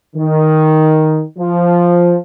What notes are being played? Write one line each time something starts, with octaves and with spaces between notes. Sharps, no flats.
D#3
F3